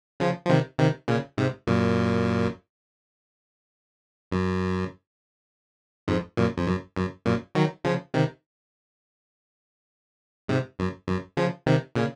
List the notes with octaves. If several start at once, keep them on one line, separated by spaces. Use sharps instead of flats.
C#3 F3
F3
C3 D#3
C3 D#3
A#2 C#3
G#2 C3
F#2 A#2
F#2
F2 G#2
F#2 A#2
F2
F#2
F#2
F#2 A#2
D#3 F#3
C#3 F3
C3 D#3
G#2 C3
F#2
F#2
C#3 F3
C3 D#3
A#2 C#3